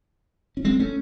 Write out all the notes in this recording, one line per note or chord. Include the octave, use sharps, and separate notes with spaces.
C#4
G#3 C4
A3 C#4